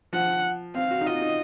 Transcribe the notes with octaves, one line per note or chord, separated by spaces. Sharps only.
F3 F#5
C4 F5
F#4
D#4
F4 D#5
D#4